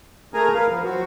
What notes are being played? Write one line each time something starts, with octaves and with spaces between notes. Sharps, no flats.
A3 G#4 A#4 G#5 A#5
A#4 B4 F5
F3 B3
F#3 C4 F#4